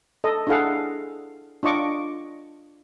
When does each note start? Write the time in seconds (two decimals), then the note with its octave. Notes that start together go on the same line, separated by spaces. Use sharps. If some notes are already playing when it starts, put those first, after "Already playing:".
0.24 A4 D#5
0.47 D4 E4 G#4 A4 F5 F#5
1.63 D4 F4 D#5 C#6 D6